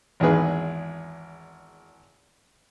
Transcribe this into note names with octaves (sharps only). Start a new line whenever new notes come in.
G#1 E2 G#2 G#4 B4